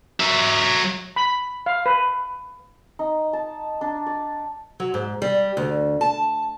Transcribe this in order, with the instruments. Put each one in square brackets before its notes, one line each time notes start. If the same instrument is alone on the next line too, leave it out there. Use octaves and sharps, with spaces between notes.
[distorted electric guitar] F#3 E5
[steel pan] B5
F5
B4
[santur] D#4
A5
D4
D5
[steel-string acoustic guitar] F#3
G#2
G3
D2
A5